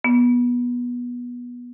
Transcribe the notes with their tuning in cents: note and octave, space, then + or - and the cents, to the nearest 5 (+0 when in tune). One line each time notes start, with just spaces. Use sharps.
B3 -20